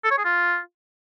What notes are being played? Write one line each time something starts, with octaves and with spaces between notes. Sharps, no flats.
A4
C#5
G#4
F4